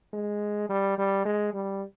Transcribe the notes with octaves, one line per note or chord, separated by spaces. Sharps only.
G#3
G3
G3
G#3
G3